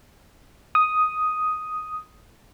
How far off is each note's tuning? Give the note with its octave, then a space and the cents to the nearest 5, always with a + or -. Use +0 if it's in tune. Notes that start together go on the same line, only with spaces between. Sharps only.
D#6 +5